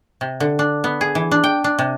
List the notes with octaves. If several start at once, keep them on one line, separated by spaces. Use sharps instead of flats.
C3
D3
D4
B3
G#4
E3
D4
G5
D4
C3